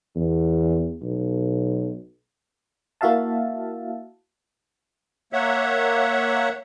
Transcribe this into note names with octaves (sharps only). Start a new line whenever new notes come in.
E2
B1
A#3 E4 F#4 E5 F5 A5
A#3 C#5 E5 F#5